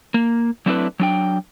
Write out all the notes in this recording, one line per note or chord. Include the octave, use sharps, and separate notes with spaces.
A#3
F#3 A3 C4 D4 E4 B4
F#3 D4 G5